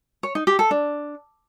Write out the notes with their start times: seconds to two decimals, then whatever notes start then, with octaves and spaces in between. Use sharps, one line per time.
0.23 C#5
0.35 D#4
0.47 G4
0.59 A4
0.71 D4